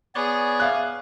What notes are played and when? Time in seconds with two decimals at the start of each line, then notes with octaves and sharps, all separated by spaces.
0.15 B3 G#4 C#5 D5
0.60 E5 F5 F#6